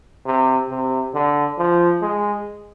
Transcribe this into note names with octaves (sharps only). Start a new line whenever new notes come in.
C3
C3
D3
F3
G#3